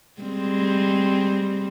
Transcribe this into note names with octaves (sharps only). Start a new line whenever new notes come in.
G3 G#3 C4